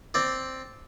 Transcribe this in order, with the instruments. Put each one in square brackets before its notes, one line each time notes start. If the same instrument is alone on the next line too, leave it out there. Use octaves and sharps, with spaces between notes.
[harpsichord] C4 D5